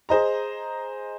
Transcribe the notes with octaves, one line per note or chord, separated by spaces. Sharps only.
G#4 C5 D#5 A#5